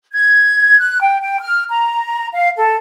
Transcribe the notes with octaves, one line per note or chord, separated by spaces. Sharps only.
G#6
F#6
G5
G5
F6
A#5
F5
A4